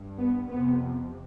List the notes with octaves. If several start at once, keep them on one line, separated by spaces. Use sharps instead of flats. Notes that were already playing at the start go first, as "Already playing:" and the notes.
Already playing: G2
B3
F2 C3 B3